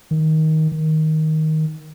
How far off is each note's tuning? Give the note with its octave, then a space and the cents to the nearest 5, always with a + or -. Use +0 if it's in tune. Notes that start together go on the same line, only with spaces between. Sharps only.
D#3 +15
D#3 +10